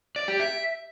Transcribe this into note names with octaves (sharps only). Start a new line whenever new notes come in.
D5
G4
E5